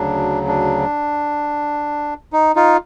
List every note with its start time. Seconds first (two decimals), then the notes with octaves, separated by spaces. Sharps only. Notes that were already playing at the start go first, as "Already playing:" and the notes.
Already playing: D2 C#3 F#3 D4
0.47 D4
2.33 D#4
2.56 D#4 F4